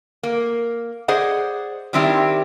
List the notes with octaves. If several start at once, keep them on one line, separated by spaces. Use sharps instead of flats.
A#3
G#4 C5 D5 D#5 F#5
D#3 G3 C4 D4 E4 G4